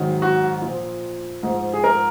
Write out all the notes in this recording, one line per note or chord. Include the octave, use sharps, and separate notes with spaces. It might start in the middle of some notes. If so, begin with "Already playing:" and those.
Already playing: G#2 D#3 F#3
F#4
A#2 F3
G#2 F3
G#4
A#4